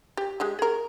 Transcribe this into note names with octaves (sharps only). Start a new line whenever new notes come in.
G4
G#3 G4 G#4
G#4 A#4